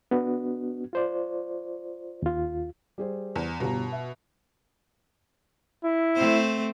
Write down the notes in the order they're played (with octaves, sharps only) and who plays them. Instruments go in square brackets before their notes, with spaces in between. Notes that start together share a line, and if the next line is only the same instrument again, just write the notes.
[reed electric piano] B3 D4 F#4
F4 C5 D5
D#2 F4
[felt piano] G3 G#4 C5
[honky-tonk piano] E2
[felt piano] G1 G4 A#5 [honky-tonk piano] B2
[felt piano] E5
[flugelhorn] E4
[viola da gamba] A3 C4 C5